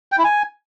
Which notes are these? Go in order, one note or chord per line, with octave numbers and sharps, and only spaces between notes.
G5
E4
G#5